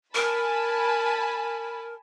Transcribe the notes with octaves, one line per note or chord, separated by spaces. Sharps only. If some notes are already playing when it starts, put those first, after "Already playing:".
A#4 G#5 A5 B5